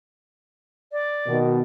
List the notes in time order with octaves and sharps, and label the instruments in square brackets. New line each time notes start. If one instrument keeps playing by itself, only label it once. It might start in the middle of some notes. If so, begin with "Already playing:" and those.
[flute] D5
[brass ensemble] B2 D#3